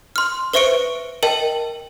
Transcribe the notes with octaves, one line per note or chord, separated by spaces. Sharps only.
C6 F6
B4 C5 E5 C#6 C#7 D7
A#4 D#5 G5 A5